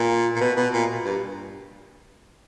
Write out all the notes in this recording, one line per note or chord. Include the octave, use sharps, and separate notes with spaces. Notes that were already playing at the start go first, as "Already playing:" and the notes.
Already playing: A#2
A#2
B2
B2
A#2
G2